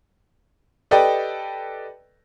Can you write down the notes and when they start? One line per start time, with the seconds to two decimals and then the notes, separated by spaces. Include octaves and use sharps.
0.91 G4 A4 B4 D5 D#5 G5